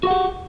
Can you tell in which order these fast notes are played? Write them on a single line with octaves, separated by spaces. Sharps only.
F#4 F#5 G4